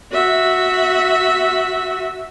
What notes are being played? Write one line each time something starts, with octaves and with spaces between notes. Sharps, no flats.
F#4 E5